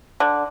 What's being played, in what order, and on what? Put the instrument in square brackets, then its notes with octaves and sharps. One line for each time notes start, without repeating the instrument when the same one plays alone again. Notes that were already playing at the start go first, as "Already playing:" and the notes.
[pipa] D3